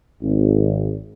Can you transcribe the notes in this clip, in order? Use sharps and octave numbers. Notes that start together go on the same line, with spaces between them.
G#1